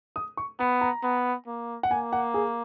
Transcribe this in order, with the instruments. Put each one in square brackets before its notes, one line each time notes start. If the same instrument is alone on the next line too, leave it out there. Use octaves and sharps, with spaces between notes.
[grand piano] D#6
C#6
[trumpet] B3 [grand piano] B5
[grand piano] A#5
[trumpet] B3
A#3
[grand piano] F#5
[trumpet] A#3 [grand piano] G#5
[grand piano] F#5
G#4